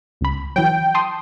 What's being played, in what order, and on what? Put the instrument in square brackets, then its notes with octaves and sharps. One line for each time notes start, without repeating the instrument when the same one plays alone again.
[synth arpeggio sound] C#2 B5
[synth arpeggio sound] E3 F#3 [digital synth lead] G5
[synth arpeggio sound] A5 C6 D#6